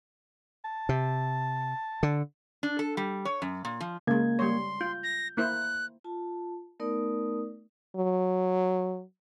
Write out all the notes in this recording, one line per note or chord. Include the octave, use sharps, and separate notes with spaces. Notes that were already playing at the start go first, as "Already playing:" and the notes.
A5
C3
D3
D4
A4
G3
C#5
F#2
A#2
F3
C#3 G#3 A#3 G#6
G3 C#5 C6
F4 G6
A#6
A#3 E4 C5 F#6
F4 A5
A3 B3 D#4 A#4 D5 D#6
F#3